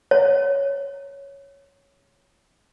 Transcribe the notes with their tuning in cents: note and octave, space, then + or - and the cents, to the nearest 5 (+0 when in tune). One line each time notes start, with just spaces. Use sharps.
C#5 +5